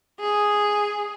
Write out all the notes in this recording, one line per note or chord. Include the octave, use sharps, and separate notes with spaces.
G#4